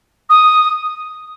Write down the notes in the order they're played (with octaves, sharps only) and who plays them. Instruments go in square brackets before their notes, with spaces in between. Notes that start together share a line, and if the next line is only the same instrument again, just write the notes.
[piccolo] D#6